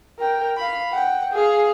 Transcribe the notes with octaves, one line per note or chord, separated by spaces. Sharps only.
A#4 G5
F5 B5
F#5 G5
G#4 F5